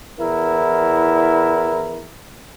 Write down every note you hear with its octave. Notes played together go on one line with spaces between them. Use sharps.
E2 E4 A#4